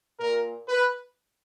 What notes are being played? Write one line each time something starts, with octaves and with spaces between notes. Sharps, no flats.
A#2 A#4
B4